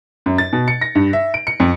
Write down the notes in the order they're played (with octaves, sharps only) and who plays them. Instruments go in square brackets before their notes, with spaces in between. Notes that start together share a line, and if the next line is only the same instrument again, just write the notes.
[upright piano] F#2
A6
B2
C#7
A#6
G2
E5
D7
C#7
F2